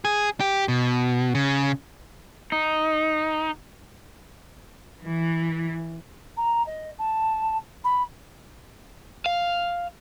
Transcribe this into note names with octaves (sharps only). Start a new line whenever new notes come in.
G#4
G4
B2
C#3
D#4
E3
A#5
D#5
A5
B5
F5